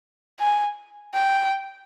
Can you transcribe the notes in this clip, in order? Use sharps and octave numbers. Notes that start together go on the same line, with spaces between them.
G#5
G5